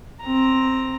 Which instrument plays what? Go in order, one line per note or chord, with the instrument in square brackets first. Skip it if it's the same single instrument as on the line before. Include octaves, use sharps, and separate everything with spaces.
[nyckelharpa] C4 A#5